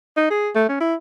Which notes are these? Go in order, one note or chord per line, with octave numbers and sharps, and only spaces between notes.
D#4
G#4
A3
C#4
E4